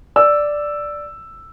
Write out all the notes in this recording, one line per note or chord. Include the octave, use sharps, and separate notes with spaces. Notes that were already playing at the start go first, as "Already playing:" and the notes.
D5 E6